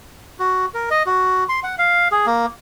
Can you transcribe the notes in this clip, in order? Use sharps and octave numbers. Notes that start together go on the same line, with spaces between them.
F#4
A#4
D#5
F#4
C6
F#5
F5
G#4
A#3